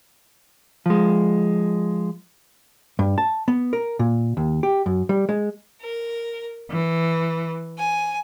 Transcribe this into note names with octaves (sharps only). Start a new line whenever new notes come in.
F3 G#3
G2
A5
B3
A#4
A#2
D#2
G4
F#2
G3
G#3
A#4
E3
G#5